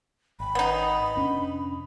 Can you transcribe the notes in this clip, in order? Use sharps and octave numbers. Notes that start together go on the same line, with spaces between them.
G#1 B5
B3 D#4
F1 C#4 D4